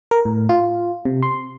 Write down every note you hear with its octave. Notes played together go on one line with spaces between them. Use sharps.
A#4
A2
F4
C3
C6